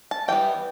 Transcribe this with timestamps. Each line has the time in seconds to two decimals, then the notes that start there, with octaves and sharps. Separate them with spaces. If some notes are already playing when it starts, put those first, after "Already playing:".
0.11 A5
0.28 E3 G3 B3 G5